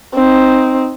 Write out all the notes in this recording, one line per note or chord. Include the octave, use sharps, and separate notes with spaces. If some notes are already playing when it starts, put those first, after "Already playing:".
C4 D#4